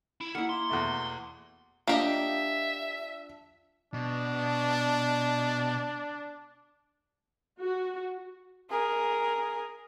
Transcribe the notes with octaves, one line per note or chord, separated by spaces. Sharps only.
E4
A#3 E4 F#5
C6
E2 B2 A3
A#3 D4 F4 G4 D#5 E5
B2 D4
F#4
G#4 A#4